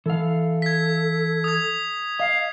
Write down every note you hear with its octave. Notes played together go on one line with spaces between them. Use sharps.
E3 A4 F5
G#6 B6
D#6 G#6
D#5 F5